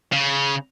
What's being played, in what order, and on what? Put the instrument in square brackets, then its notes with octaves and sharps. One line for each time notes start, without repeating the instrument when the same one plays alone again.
[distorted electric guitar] C#3